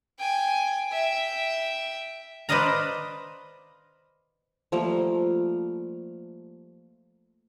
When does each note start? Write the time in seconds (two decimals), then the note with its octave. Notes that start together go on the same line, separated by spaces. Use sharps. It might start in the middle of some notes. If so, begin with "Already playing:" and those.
0.19 G5 G#5
0.92 E5 G5
2.49 B4 C5 D5 D#5 F5 A#5
4.72 F3 G3 A3 A#3